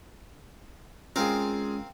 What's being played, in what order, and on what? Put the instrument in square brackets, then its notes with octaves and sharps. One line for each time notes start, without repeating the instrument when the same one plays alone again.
[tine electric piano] G#3 C#4 [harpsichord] C4 A#4 F5 [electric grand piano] F4 G#4